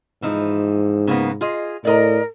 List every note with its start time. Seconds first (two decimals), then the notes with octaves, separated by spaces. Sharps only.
0.22 G#2 E3 F3 D#4
1.07 C#3 A#3 B3
1.41 F4 G#4 D#5
1.85 A2 A#4 D5 D#5 A#5